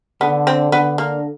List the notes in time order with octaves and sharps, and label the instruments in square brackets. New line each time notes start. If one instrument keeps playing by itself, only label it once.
[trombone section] D3 [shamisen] B3
[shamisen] C4
[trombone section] D3 [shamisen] B3
[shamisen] A#3